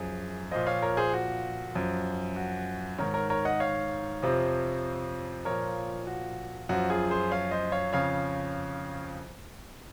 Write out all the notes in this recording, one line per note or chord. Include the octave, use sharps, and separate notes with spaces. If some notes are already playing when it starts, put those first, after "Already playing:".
Already playing: F#2 F3 G#4
A#2 F3 C5 D#5
C#5 F5
A#4 C#5
G#4 C5
F#4
F#2 F3
F#4
G#2 D#3 A#4 C#5
A#4 C#5
A#4 C#5
D#5 F#5
C#5 F5
F2 C3 F3
A#2 F3 A#4 C#5
F#4
F#2 F3 F#4
F4 G#4
G#4 C5
C#5 F5
C5 D#5
C#5 F5
F2 C#3 F3 C#5 F5